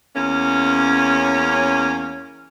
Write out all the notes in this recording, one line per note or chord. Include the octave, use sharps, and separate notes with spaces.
E2 A#3 C#4